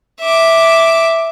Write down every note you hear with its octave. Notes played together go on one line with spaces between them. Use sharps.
E5 D6